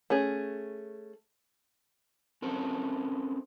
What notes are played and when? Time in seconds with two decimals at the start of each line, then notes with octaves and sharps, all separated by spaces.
0.10 A3 C#4 G#4
2.42 C4 C#4 A4 A#4 C5